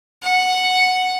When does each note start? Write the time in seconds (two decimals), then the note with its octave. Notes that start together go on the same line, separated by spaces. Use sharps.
0.23 F#5